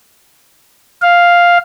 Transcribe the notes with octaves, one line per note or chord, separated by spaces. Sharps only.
F5